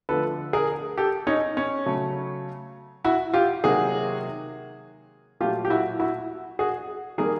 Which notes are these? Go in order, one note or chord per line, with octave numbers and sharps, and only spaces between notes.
D3 F3 A3 A4 B4
G#4 A#4
G4 A4
C#4 D#4
C#4
C#3 F#3 A3
E4 F#4
F4 G4
C3 D#3 F#3 A#3 F#4 G#4
A#2 F#3 A3 F4 G4
G4
E4 F#4
E4 F#4
F#4 G#4
D#3 G3 A#3 G#4 A#4